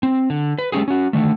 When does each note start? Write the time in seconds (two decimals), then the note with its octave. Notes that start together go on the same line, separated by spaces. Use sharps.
0.03 C4
0.30 D3
0.58 B4
0.72 G#3 A3 C#4 G4 G#4
0.88 C#4 F#4
1.13 D3 D#3 A3